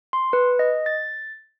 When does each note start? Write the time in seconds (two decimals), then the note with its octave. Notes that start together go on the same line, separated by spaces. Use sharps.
0.13 C6
0.33 B4
0.59 D#5
0.86 A6